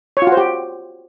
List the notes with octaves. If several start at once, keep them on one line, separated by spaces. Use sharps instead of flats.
C#5
F4
F#4
C5
G4